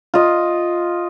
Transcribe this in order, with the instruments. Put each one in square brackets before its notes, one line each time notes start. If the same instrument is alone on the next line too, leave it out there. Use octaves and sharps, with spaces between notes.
[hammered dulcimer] F4 D#5